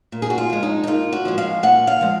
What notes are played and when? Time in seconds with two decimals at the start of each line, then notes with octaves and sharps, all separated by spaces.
0.12 A#2
0.22 G#4
0.30 F#4
0.38 F4
0.50 F3 G#3
0.63 D#4
0.84 D#4
0.87 A#2 F4
1.12 F#4
1.25 F3 G#3
1.38 F5
1.63 A#2 F#5
1.87 F5
2.01 F3 G#3